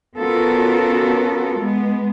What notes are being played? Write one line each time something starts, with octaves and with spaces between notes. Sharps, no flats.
B3 C#4 F4 F#4 A4 A#4
G#3 B3